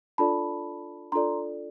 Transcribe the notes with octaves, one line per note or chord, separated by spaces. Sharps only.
D4 F4 A4 D5 A5 B5
D4 F4 A4 D5 A#5 C6